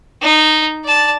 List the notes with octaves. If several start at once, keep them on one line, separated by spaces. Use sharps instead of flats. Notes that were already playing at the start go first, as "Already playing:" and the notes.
D#4
D5 A5